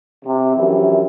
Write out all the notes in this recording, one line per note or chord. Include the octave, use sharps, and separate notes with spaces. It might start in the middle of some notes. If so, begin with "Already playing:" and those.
C3
A#1 F#2 E3 G4 E5